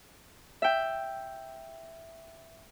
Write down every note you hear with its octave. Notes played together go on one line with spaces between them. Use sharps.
E5 G5